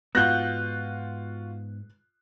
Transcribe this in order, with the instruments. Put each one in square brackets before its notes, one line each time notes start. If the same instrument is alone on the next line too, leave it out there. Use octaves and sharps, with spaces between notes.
[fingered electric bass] G#2 G#3 [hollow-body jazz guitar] B3 [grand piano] F4 F#4 A#6 [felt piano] F#6 G6